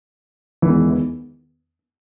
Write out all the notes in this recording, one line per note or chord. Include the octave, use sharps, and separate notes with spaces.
E2 D#3 E3 G#3 B3